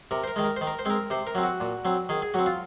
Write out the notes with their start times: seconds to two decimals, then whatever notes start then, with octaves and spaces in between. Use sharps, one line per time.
0.11 C3 A#4
0.24 C5
0.28 A#4
0.36 D#3 G#3
0.44 A#4
0.56 D#3 C5
0.67 A#4
0.79 C5
0.85 G#3 C4 A#4
1.10 C3 C5
1.27 A#4
1.35 F#3 C4
1.43 F#4
1.61 A#2
1.85 F#3 C4
2.09 D#3 G#4
2.22 G#4
2.34 F#3 C4 F#4
2.46 F4